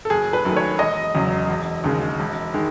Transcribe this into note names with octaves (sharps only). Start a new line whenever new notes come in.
A4
F#1 G#4
B4
F#2 D#3 A3
C#5
E1 D#5
E2 C#3 F#3
E1
D#2 C#3 G#3
E1
D#3 G#3